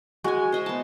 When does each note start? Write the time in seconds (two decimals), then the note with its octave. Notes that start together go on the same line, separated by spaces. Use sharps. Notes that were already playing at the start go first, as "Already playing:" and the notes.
0.24 G#3 F#4 G#5
0.52 C5 D#5 E5
0.66 B3 A5